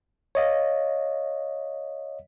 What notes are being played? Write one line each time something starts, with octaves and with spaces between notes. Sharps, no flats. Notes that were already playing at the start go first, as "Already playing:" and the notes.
C#5 D#5 F5